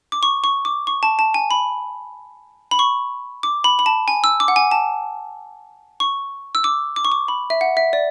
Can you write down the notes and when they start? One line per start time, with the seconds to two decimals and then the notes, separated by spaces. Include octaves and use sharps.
0.12 D6
0.23 C#6
0.44 C#6
0.65 D6
0.87 C#6
1.03 A5
1.19 A5
1.34 G#5
1.51 B5
2.71 B5
2.79 C#6
3.43 D6
3.64 B5
3.79 B5
3.86 A5
4.08 G#5
4.24 E6
4.40 D6
4.48 F#5
4.56 G#5
4.71 A5
6.00 C#6
6.55 E6
6.64 D6
6.96 D6
7.05 C#6
7.12 D6
7.28 B5
7.50 E5
7.61 F#5
7.77 E5
7.93 D5